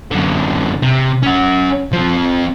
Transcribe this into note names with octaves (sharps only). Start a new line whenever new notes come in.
F#2 D3
C3
C#4 F#5
F3 C4